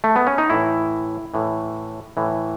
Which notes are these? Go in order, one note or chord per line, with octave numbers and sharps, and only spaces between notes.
A3
B3
C#4
D#4
A2 E3 E4
A2 E3
A2 E3